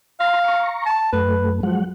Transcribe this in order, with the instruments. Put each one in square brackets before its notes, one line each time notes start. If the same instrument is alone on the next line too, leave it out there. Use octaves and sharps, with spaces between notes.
[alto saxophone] F5 [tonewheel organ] A#5 C6
[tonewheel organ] A#5 C#6
[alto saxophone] A5
[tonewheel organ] F#2 A3 [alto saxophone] B4
[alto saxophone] F3 [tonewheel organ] F#3 G#3 F#5